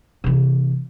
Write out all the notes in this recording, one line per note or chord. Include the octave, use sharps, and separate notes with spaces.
C3 E3